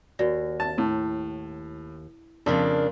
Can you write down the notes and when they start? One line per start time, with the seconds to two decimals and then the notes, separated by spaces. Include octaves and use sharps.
0.19 D#2 F#4 D5 A#6
0.60 A5
0.78 A2 E4
2.46 F2 C#3 A#3 D4